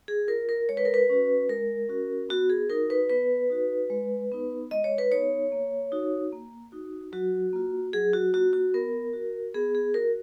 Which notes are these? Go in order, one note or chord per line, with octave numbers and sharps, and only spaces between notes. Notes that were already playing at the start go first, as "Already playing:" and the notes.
G#4
F4 A#4
A#4
G#3 C#5
B4
A#4
B4
C#4 F#4
G#3 A#4
C#4 F#4
B3 F#4
G#4
D#4 F#4 A#4
B4
B3 B4
D#4 F#4
G#3
B3 D#4
G#3 D#5
C#5
B4
B3 D#4 C#5
A#3
D#4 F#4
A#3
D#4 F#4
F#3 F#4
A#3 F4
F#3 G#4
F#4
A#3 F4 F#4
F#4
B3 A#4
F#4
B3 G#4
G#4
F#4 A#4